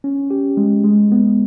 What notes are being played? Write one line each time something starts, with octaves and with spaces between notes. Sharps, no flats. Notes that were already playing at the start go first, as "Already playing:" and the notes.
C#4
G4
G#3
G#3
B3